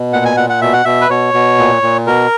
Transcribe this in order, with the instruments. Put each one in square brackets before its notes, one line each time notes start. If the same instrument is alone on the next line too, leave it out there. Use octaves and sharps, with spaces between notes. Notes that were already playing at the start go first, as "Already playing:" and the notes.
Already playing: [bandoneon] B2
A#2 F#5
G#5
A#2 F#5
F#5
B2 E5
F#5
B2 E5
B4
B2 C#5
B2
A#2
A#2
B2 A#4